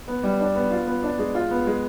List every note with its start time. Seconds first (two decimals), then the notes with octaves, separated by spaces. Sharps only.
0.08 B3
0.23 G3
0.40 D4
0.55 B3
0.71 F4
0.87 B3
1.03 D4
1.19 G#3
1.35 F4
1.51 B3
1.67 G#3